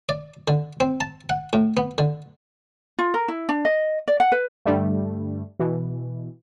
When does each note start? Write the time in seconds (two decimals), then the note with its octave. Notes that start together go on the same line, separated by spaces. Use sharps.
0.09 D5
0.48 D3
0.80 C4
1.01 A5
1.29 F#5
1.53 A2
1.77 B3
1.98 D3
2.99 F4
3.14 A#4
3.28 E4
3.49 D4
3.65 D#5
4.08 D5
4.20 F#5
4.32 B4
4.66 G2 D3 G3 A3
5.59 B2 E3